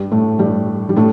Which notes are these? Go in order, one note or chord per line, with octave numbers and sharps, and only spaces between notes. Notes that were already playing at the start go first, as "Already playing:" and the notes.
Already playing: G2 G3
A2 A3
G2 G3
G3
A2 A3